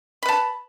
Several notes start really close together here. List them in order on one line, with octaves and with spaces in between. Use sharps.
B5 B4 A5